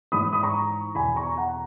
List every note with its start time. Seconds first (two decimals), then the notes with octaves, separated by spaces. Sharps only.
0.12 G#2 E3 B5 D#6
0.33 B5 D#6
0.43 A#5 C#6
0.95 E2 B2 G#5 B5
1.16 A#5 C#6
1.37 F#5 A#5